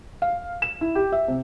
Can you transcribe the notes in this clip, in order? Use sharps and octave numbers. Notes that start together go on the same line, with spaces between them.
F5
E7
E4
G4
E5
C3